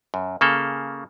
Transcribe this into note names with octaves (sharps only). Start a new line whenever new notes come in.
F#2
C#3 A#3 A4